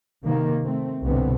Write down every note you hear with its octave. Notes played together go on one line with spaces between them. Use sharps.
C3 D#3 A#3
A3 C4
C2 G2 B2 D3 B3 C4